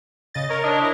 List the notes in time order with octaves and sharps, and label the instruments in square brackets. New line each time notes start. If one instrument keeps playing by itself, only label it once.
[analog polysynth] C#3 D#5 A6
A#4 C#5
[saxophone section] D4 D#5
[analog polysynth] E4 A#4